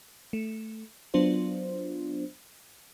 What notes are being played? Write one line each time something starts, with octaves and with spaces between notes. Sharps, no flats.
A3
F#3 B3 D4 F4 C5